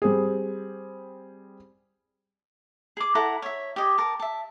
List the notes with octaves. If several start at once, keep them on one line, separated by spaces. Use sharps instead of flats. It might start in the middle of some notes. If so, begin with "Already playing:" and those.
G3 C4 G#4
G#4 D6
E4 A4 F#5 A#5
C#5 E5
G4 D#5 G#5
A#4 A5
E5 A5